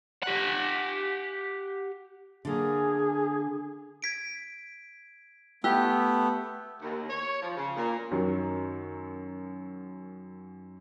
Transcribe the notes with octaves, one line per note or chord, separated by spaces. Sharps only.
G4 F#5
D3 A#3 G#4
G#6 B6 D7
A3 B3 G4 E6 F#6 G6
D#2
C#5
F3
C#3
A#2
F#2 D#3 F#3